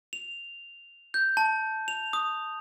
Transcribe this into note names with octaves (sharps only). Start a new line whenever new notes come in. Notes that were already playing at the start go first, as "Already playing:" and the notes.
F7
G6
A5
F7
D#6